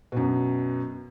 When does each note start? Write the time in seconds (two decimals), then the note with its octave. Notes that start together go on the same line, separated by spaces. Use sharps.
0.12 F#2 B2